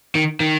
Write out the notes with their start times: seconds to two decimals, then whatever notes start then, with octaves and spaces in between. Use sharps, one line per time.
0.15 D#3
0.40 D#3